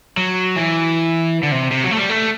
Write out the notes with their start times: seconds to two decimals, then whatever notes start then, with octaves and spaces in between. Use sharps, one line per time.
0.17 F#3
0.56 E3
1.43 D3
1.52 C3
1.71 C3
1.84 F#3
1.91 A3
1.97 G3
2.10 A3